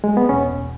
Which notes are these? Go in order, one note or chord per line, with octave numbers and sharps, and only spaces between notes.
G#3
B3
E2 B2 C#4